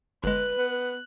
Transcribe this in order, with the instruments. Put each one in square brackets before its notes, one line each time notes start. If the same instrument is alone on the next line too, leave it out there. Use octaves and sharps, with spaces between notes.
[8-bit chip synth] G1 G#3 [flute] B4 [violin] F#6
[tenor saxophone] B3